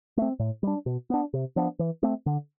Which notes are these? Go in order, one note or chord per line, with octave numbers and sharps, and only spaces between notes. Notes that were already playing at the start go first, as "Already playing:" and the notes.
A3 C4
A2
G3 D4
B2
B3 D4
C3
F3 B3 D4
E3
A3 C4
D3